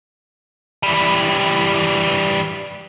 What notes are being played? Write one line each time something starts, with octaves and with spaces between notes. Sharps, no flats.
E3 G3